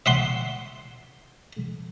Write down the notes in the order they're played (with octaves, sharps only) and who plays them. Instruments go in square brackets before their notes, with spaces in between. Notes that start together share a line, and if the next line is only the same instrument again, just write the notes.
[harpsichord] E5 F#5 C6